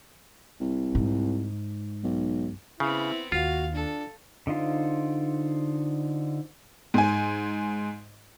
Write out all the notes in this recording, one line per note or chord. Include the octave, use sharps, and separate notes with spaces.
C2
G#2
B1
C#3 B3 C4 E4
D#2 F4 F#4 F5
D4 A4
D3 D#4 F4 C5
G#2 G#5